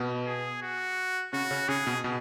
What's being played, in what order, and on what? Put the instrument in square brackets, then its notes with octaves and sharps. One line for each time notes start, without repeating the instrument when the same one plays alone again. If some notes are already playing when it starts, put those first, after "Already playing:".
Already playing: [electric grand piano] B2 B3
[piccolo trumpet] G#4
F#4
[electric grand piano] C#3 C#4 [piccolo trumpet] F#4
[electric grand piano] C#3 C#4
[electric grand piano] C#3 C#4 [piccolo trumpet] G#4
[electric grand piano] B2 B3
B2 B3